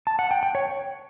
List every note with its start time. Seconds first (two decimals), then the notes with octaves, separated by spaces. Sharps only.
0.07 A5
0.19 F#5
0.31 G5
0.43 G5
0.55 C#5